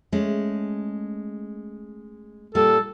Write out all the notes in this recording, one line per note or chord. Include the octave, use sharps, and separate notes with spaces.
G#3 A3 C#4
A#2 G3 A#3 A4